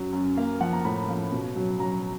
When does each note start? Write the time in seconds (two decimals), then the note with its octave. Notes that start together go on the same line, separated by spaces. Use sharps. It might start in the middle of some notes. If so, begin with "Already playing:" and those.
Already playing: F#2 F#3
0.13 F#2
0.37 A#3 F5
0.61 F3 F#5
0.73 A#5
0.85 A2 B5
1.08 F3
1.32 B2
1.56 F#3
1.79 F#3 A#5